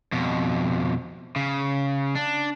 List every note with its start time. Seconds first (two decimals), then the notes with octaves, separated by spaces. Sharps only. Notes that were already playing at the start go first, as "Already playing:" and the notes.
0.12 F2 B2
1.36 C#3
2.15 D4